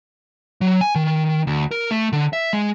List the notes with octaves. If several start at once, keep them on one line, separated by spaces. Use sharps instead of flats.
F#3
G#5
D#3
D2
A#4
A3
D3
E5
G#3